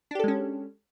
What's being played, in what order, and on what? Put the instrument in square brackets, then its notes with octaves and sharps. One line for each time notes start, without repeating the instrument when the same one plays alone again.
[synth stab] D4
G4
A4
G#3
C#4